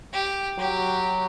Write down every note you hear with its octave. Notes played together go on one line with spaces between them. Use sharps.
G4
F#3 G4